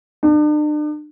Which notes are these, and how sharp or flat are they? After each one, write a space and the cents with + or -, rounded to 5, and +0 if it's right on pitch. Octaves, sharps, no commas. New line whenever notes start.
D4 +40